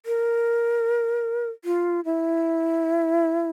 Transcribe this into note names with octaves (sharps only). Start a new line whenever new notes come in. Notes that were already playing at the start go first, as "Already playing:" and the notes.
A#4
F4
E4